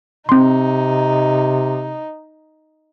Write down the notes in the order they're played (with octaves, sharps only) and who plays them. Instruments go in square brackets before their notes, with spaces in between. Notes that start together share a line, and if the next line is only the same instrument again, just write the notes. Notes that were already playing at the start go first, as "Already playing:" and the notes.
[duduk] C3 [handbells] C4 C6 [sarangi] D#4